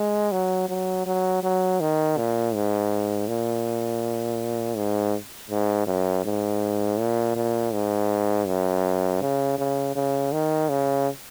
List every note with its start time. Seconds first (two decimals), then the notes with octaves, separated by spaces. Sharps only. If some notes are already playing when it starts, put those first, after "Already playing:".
Already playing: G#3
0.32 F#3
0.69 F#3
1.06 F#3
1.43 F#3
1.81 D#3
2.17 A#2
2.54 G#2
3.28 A#2
4.76 G#2
5.51 G#2
5.87 F#2
6.25 G#2
6.99 A#2
7.36 A#2
7.73 G#2
8.47 F#2
9.21 C#3
9.58 C#3
9.95 C#3
10.32 D#3
10.69 C#3